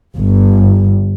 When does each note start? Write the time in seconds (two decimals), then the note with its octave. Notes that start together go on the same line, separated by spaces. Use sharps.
0.16 G1